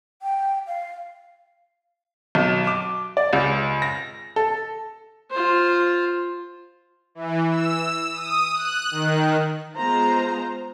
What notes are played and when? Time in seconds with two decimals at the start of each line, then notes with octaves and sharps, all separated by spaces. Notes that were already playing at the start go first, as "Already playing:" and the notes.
0.22 G5
0.67 F5
2.35 B1
2.67 D6
3.17 D5
3.33 C#2
3.82 A#6
4.36 A4
5.31 F4 C5
7.15 E3
7.49 E6
8.12 D#6
8.53 F#6
8.91 D#3
9.76 G#3 B3 F4 C5 A#5